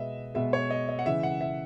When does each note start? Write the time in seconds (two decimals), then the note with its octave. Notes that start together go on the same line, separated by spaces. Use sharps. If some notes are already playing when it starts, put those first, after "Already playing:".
Already playing: B2 G#3 B3 D#5 E5
0.35 B2 G#3 B3 E5
0.53 C#5
0.70 D#5
0.89 D#5
0.99 F#5
1.06 C#3 E3 G#3 E5
1.23 F#5
1.41 E5